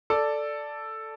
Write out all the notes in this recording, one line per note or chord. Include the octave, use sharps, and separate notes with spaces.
A4 D5